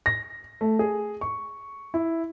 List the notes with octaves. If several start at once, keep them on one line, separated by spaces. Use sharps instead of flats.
A#6
A3
G#4
C#6
E4